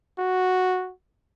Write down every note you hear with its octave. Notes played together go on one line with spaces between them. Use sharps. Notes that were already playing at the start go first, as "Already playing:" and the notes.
F#4